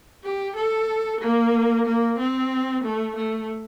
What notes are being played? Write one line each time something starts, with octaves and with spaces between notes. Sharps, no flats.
G4
A4
A#3
A#3
C4
A3
A3